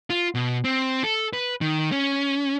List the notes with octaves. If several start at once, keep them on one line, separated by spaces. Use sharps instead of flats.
F4
B2
C4
A4
B4
D#3
C#4